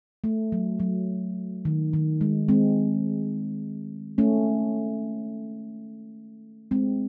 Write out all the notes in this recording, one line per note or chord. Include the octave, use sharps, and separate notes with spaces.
A3
F#3
F#3
D#3
D#3
G#3
G#3 C4
A3 C#4
G#3 C4